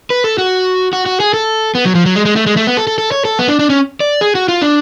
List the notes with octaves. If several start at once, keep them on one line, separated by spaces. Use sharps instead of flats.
B4
A4
F#4
F#4
F#4
G#4
A4
B3
F#3
F3
F#3
G#3
G#3
A3
G#3
A3
B3
A4
A4
A4
C#5
A4
B3
D4
D4
C#4
D5
G#4
F#4
F4
D4